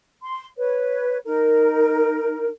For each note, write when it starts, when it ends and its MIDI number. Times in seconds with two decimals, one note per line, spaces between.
0.22 0.47 84
0.57 1.18 71
0.57 1.18 73
1.25 2.49 63
1.25 2.49 70